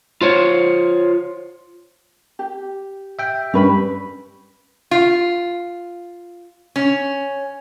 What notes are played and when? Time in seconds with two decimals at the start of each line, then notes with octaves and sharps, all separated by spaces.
0.21 F4 C5 C#5
2.39 G4
3.19 E5 G5
3.54 G2 G3 C#4 B4 B5
4.91 F4
6.76 C#4